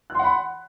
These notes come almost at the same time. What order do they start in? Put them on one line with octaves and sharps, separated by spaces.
F#6 C6 F#5 B5